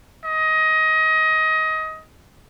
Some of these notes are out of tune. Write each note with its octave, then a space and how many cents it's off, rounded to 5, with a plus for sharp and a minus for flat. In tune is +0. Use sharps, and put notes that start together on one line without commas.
D#5 +20